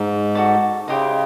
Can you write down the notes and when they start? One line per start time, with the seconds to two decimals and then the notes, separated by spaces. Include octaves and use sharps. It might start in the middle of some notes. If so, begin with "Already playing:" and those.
Already playing: G#2
0.35 F#4 A4 D5
0.88 C#3 E4 G4 C5 D#5